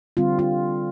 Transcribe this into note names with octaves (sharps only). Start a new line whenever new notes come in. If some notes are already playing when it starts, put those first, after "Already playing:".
D3 G3 C4 F4
F4